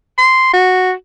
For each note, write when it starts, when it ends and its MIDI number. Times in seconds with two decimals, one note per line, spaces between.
0.18 0.51 84
0.53 0.92 66